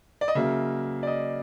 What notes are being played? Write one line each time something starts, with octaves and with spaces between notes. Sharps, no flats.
D5
D#5
C#3 F#3 A#3 E5
D5
D#5